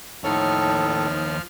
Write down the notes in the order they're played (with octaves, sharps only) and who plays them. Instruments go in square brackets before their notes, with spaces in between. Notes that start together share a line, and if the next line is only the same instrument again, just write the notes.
[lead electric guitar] D#2 C#5 [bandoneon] A2 A4 [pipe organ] F3 F6 [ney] D#4